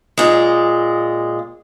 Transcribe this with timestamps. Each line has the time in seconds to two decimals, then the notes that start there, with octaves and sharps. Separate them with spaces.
0.18 A#2 G#3